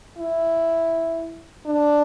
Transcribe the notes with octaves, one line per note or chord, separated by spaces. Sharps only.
E4
D4